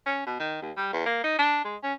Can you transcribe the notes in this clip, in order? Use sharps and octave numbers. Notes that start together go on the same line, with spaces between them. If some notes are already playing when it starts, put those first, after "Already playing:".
C#4
B2
D#3
D#2
G3
E2
A#3
D#4
D4
G#3
C#4